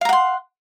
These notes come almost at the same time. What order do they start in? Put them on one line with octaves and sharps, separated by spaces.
F5 A#5 F#5 C6